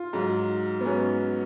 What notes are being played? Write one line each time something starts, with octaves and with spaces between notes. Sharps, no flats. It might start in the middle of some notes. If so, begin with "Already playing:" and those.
Already playing: F4
G#2 F#3
B3
G#2 F#3 C#4